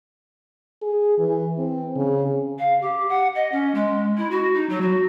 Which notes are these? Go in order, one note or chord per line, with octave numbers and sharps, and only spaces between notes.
G#4
E3
C4
C#3
F5
G4
F#5
D#5
C#4
G#3
E4
F#4
D#4
F#3
F#4